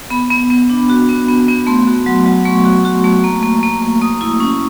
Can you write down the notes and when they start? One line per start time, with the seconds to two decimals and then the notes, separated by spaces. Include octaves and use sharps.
0.10 B3 B5
0.31 B3
0.50 B3
0.70 D4
0.90 F#4
1.09 B3
1.28 B3
1.48 B3
1.67 A3 C6
1.87 F#4
2.06 F#3
2.26 F#3
2.45 A3 C#6
2.65 F#4
2.85 F#4
3.04 A3
3.24 A#3
3.43 A#3
3.63 A#3
3.82 A#3
4.01 A#3 D#6
4.21 E4
4.40 C#4